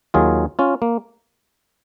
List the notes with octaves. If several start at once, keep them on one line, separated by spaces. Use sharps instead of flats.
D#2 D#3 F#3 F4 G#4
C#4 F4
A#3